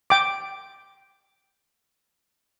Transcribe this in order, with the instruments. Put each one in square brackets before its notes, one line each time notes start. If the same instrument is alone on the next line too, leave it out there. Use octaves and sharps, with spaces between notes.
[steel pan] G5 D6